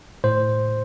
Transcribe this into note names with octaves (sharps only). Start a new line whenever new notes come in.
A2 C5